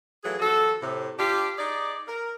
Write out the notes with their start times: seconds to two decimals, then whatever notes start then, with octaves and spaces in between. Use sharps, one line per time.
0.24 E3 F#3 A3 F4 G#4
0.40 D#2 F3 F#4 A4
0.82 A2 C3
1.19 D4 F4 G4
1.58 D#4 G#4 D5
2.08 A#4